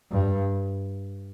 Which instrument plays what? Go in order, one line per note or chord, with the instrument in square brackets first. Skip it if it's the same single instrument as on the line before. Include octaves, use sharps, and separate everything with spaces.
[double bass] G2